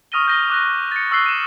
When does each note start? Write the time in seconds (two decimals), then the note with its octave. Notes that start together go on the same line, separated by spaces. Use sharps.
0.12 C#6 D#6 F6 A#6 D#7 G7
0.28 G6 A#6 G7
0.50 D6 F#6 A#6
0.92 A6 C#7
1.11 C#6 E6 F#6 C7 G7
1.26 D#7 E7